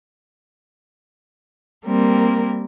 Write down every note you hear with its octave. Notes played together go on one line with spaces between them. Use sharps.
G3 A#3 C4 A#4